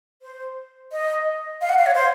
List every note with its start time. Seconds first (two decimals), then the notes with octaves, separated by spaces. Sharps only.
0.22 C5
0.92 D#5
1.61 F5
1.69 F#5
1.78 F5
1.86 C#5
1.95 C5